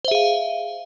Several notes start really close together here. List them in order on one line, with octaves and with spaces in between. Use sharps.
C5 E5 G#4 F5